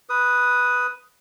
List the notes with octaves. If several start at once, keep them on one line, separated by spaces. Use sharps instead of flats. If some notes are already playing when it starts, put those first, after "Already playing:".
B4 D#6